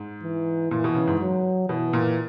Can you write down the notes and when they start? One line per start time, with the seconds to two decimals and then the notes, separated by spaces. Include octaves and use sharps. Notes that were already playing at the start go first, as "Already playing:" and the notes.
Already playing: G#2
0.22 E3
0.71 A#2 E3
0.84 B2
0.95 C#3
1.07 G#2
1.20 F#3
1.69 B2 E3
1.93 A#2